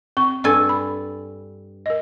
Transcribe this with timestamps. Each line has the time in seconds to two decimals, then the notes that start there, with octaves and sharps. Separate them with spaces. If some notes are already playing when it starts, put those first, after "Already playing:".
0.17 C4 C#6
0.44 G2 A4 G#5
0.69 B5
1.86 A#4 D#5